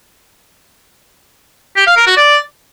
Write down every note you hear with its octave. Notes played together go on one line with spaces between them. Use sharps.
G4
F5
A#4
F#4
D5